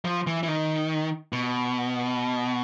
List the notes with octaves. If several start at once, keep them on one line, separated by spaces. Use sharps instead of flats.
F3
E3
E3
D#3
B2